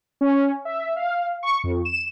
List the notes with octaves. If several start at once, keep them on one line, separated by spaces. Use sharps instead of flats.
C#4
E5
F5
C#6
F2
E7